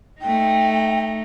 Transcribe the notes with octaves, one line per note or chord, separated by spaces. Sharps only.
A3 D#4 G5